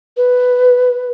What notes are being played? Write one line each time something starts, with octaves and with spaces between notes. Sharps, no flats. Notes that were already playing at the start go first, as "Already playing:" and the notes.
B4